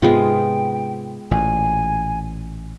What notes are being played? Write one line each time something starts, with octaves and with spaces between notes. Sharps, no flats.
G#2 C3 G#3 B3 F4 G5
A1 A#2 G#5